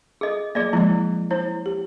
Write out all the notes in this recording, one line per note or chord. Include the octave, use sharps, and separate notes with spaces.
G#4 A4 D#5
F#3 A#3 G#4 D5 D#5
F3 G#3 E4 D5 D#5
E4 C5 C#5
G4